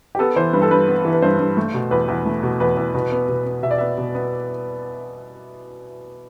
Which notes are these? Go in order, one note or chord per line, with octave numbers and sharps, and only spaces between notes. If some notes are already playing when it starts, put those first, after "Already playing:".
G4
B3 A4
E3 C5
G2 B4
A4
G2 B4
B3
E3
B4
G2 C5
G2
A3
B2
E2 B4
E2
A3
B2
E2 B4
E2
B2
B3
B2
B3
B2 E5
D5
B3 E5
B2
B3